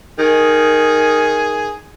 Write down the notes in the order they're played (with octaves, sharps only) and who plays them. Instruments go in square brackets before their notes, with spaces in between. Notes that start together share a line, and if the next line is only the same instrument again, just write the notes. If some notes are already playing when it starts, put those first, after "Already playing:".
[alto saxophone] D#3 [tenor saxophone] G#4